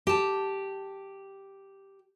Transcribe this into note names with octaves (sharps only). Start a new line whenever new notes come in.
G4 A5